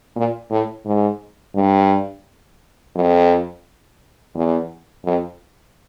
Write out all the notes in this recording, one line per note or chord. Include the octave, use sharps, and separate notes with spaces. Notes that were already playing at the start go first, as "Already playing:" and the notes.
A#2
A2
G#2
G2
F2
E2
F2